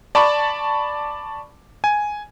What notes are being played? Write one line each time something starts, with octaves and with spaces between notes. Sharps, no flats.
D5 A5 B5 C#6
G#5